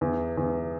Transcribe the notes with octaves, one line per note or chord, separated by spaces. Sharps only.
E2
E2